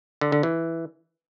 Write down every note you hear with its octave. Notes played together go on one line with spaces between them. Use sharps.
D3
D3
E3